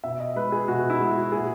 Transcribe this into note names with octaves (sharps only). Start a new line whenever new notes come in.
B2 E5
D#5
G#3 B4
G#4
B2 F#4
E4
G#3
F#4
A#2 G#4